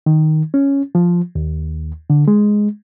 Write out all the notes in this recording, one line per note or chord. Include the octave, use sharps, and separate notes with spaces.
D#3
C#4
F3
D#2
D3
G#3